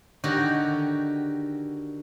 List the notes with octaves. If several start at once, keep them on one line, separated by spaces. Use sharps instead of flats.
D3 D#3 F#4 G4